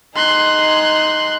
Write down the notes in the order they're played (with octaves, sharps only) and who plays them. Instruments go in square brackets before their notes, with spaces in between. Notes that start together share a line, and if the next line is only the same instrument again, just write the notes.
[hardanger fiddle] D#4 G#4 [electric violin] C6 F#6